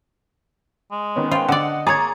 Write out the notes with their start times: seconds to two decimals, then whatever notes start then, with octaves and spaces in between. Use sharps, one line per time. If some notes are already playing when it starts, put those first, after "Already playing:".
0.91 G#3
1.16 D#3 B3 C#4
1.31 F4 C5 G5
1.48 D3 D5 D#5 F#5 A5
1.87 A#3 G#4 C#5 G#5 A#5 D6 G#6 A6